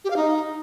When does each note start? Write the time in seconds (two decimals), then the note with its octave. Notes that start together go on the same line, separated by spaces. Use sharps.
0.04 G4
0.10 F5
0.16 D#4